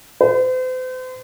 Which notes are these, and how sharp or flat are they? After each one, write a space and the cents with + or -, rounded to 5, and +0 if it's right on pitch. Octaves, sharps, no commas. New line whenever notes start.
C5 -40